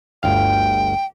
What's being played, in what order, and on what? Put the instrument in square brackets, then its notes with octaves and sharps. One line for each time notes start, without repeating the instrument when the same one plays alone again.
[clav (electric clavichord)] G1 D2 F5 [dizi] G5